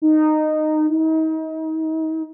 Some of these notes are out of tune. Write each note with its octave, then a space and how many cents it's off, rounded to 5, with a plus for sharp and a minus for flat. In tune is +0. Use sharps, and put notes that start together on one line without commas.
D#4 -15
D#4 +35